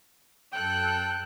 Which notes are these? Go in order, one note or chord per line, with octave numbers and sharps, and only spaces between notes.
F#2 A4 G5 F#6